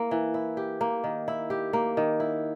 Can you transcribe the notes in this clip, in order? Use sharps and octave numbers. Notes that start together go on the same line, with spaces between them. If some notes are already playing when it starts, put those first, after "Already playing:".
Already playing: A#3 E4
E3
E4
G4
A#3
D#3
E4
G4
A#3
D#3
E4